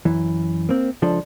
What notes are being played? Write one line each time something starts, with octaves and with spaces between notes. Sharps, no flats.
F#2 E3
A#3 C4
C#2 F3 D4 A4